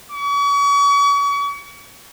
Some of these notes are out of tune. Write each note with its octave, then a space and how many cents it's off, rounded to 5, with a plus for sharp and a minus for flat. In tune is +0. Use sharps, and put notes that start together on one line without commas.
C#6 +40